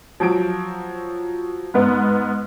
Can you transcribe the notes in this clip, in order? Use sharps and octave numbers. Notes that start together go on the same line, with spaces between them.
F3 F#3 D7
G#2 B3